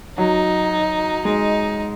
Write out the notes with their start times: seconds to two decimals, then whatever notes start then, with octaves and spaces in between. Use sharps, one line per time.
0.17 F#3 D#4
1.25 G#3 D#4